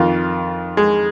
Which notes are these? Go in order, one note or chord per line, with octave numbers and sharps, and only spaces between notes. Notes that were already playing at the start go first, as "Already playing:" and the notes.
Already playing: F2 D#3 F4
G#3